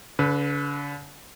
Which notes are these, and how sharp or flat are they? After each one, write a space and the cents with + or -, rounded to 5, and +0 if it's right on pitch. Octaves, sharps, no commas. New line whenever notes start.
D3 -45 B4 +0